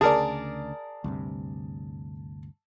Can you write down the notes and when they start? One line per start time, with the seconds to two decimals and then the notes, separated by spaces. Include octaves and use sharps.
0.01 D2 C#3 G#4 A#4 D5 A5
1.04 D2 G2 C3